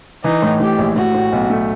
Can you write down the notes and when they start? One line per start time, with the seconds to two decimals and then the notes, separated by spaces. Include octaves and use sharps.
0.24 E3 D#4
0.42 A2
0.60 A2 G4
0.78 A#1
0.96 A2 F#4
1.15 A2
1.33 B1
1.50 A3